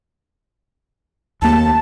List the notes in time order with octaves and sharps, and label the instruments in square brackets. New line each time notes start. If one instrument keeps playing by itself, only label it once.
[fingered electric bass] D#2 A#3 [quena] A5